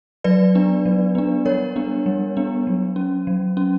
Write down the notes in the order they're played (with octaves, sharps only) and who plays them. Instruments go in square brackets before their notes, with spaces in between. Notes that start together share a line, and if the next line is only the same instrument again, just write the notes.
[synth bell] F#3 B4 D5
B3 D4
F#3
B3 D4
G3 A#4 C#5
B3 D4
G3
B3 D4
F#3
C#4
F#3
C#4